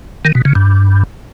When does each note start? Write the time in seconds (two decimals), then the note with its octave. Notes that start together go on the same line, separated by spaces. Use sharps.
0.25 D#3
0.35 B2
0.45 C#3
0.55 G2